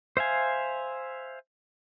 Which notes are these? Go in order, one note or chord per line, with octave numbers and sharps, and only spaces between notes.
C5 E5 F5 G#5